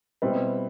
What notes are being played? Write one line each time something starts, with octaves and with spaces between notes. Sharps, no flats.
B2 G3 C4 E4 B4